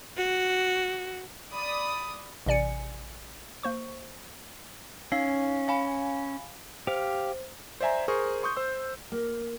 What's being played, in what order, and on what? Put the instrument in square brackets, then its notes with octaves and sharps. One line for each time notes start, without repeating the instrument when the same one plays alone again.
[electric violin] F#4
[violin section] D5 B5 D#6
[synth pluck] A1 C3 D5 G#5 C#7
A#3 C5 C#6
[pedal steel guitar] C#4 [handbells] D#4 F5 C7
[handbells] F5 G#5 B5
[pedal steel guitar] G4 F5 [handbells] C5
[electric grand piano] C5 D5 E5 G#5 A#5
G#4 A#4 C5 C#6
C6 C#6 D#6 G6
C5 E6
[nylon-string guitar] A#3